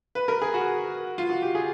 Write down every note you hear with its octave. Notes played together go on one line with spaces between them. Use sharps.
B4
A#4
G#4
F#4
F4
F#4
G4
G#4